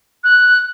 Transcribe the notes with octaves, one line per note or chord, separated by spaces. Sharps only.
F#6